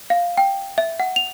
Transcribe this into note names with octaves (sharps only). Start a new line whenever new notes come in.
F5
G5
E5
F#5
F7